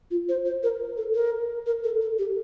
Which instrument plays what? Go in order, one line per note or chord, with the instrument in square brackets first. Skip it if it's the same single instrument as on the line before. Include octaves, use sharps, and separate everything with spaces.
[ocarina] F4
C5
C5
A#4
A4
A#4
A#4
A4
A4
G4